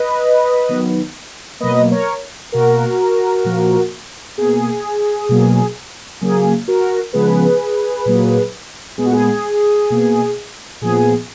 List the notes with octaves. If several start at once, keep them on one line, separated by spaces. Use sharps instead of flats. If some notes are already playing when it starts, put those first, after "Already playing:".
Already playing: B4 D#5
D#3 F#3 B3
B2 F#3 A#3 B4 D#5
A#4 C#5
B2 A#3 F#4 A#4
A#2 F3 A#3
B2 A#3 G#4
B2 F#3 A#3
C#3 F#3 A#3 G#4
F#4 A#4
C#3 F3 G#3 B3 G#4 B4
A#2 F#3 A#3
A#2 G#3 B3 G#4
F#4
G#4
B2 A#3
A#2 F3 B3 G#4